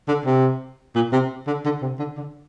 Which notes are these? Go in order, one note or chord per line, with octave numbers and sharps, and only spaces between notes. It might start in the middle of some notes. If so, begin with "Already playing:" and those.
D3
C3
A#2
C3
D3
D3
C3
D3
D3